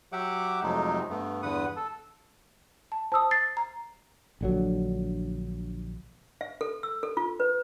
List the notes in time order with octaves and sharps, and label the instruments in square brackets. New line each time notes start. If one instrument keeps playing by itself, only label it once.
[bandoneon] F#3 G4 E5 F#5 D6
F2 C3 F#3 G#3 A3 D#4
G2 A3 B3
E2 G2 D3 B4 F#5 D#6
A4
[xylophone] A5
[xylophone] C5 D#6 [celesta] A5 E6
[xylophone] A6 [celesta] C7
[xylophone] A#5
[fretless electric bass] A#1 D3 F#3
[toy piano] E5
A4
E6
A4
F4
B4